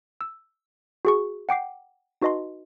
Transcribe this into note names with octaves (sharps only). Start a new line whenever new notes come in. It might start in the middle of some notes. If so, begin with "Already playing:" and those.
E6
F#4 G#4 C#6
F#5 G5 D6 C7
D#4 F#4 B4 D#5 A5 C6